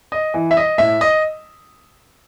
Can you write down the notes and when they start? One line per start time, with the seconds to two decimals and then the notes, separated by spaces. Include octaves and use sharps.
0.12 D#5
0.34 E3
0.51 E5
0.57 D#5
0.78 A2 E5
1.01 D#5